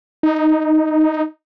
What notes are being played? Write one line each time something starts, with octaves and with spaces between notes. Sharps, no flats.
D#4